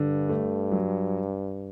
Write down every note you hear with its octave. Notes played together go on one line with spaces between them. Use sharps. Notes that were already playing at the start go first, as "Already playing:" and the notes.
Already playing: G2 D3
A3
F#3